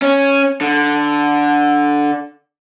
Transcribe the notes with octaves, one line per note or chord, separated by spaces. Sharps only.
C#4
D3